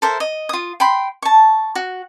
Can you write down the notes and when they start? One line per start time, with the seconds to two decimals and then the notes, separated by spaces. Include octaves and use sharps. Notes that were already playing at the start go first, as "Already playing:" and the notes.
0.02 A4 A#4 C5 E5
0.20 D#5
0.49 F4 D#6
0.80 G5 B5 C6
1.22 A5 C#6
1.75 F#4